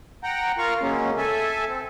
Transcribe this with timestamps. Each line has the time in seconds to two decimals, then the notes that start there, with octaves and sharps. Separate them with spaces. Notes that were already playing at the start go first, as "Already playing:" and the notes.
0.23 F#5 G5 A#5
0.58 F4 A#4 F5 A#5 C#6
0.82 C#3 F#3 G#3 A#3 C#4
1.17 A4 E5 G#5
1.68 C4